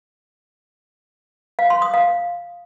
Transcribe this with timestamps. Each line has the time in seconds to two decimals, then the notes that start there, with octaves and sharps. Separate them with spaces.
1.59 F5
1.70 C6
1.82 D#6
1.94 F5